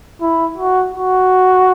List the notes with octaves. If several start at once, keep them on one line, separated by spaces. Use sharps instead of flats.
E4
F#4
F#4